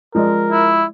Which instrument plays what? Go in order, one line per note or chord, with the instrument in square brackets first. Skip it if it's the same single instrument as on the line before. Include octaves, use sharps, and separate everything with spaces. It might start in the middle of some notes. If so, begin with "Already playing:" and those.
[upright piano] F3 G#3 D5 [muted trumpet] A#4
[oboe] E4